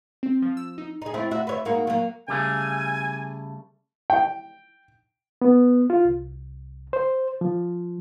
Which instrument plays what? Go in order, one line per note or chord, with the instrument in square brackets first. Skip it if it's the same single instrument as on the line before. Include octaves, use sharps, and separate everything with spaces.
[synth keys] C4
F3
E6
D#4
[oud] D#4 G#4
A3 C4 E4
F#4 E5
B4 C#5 E5
G#2 A#3 F#4
F#3 A#3
[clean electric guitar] C#3 G3 A3 [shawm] G#5
[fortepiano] G5
[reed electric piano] B3
F4
C2
C5
F3